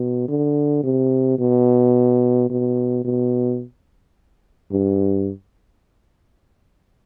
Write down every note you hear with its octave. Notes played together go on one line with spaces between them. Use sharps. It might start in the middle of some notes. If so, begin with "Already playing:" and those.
Already playing: B2
D3
C3
B2
B2
B2
G2